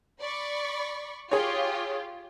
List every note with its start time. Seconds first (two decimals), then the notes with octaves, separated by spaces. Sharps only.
0.21 D5 B5 C#6
1.31 F4 G4 G#4 C#5